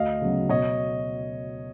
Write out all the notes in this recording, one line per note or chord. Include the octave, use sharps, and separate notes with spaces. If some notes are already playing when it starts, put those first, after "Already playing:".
Already playing: D2 D#5 F5
C#3 F#3 B3
B2 C#5 D#5